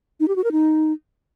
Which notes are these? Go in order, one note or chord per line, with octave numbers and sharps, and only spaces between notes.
D#4
G4
F#4
A#4
D#4